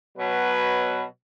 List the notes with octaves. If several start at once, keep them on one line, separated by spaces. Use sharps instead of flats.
B2 F#3 B4